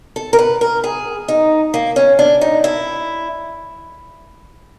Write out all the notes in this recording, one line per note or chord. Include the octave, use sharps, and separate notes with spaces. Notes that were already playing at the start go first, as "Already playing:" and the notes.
A4
A#4
B4
A#4
G#4
D#4
A#3
C#4
D4
D#4
E4